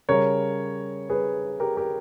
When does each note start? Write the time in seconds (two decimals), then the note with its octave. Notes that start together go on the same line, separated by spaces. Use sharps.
0.09 C#3 G3 A#4 C#5
1.10 G#4 B4
1.60 G4 A#4
1.77 G4 A#4